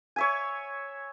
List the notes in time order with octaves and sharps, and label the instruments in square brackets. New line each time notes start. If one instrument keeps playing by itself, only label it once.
[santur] C#5 E5 G#5